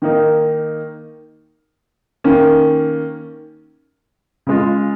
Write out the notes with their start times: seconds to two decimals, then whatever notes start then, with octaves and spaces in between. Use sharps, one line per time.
0.02 D#3 A#3 D#4
2.24 D#3 A#3 C#4
4.47 C#3 G#3 F4